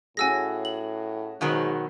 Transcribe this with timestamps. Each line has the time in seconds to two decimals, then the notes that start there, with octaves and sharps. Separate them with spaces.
0.17 A2 C#4 F#4 G#4 G#5 E6 A#6
0.65 F#7
1.41 G#2 B2 D#3 F#3